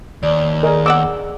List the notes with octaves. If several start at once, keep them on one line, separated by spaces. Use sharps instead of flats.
D#2 D5
G#4 A#4 D5 D#5 G#5
B3 D#5 F#5 D6 E6